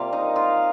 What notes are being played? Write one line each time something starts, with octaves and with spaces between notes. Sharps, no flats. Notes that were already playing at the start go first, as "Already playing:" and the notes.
Already playing: C3 G3 A#3 F4 F5
D#4 D#5
F4 F5